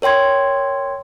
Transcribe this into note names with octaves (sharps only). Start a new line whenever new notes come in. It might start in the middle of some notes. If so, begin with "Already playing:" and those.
A#4 C#5 G5 C6 G#6